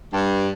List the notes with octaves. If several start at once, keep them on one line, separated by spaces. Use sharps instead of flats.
G2